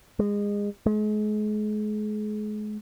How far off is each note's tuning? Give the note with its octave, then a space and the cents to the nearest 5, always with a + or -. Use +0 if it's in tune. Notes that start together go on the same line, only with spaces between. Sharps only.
G#3 -25
G#3 +35